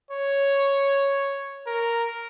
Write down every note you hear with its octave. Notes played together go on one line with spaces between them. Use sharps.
C#5
A#4